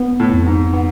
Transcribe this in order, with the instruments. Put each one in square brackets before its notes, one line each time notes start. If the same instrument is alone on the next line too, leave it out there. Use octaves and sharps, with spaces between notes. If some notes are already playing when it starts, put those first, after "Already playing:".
Already playing: [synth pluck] B3
[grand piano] A2
[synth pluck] F2
[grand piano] G#2
[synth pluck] B3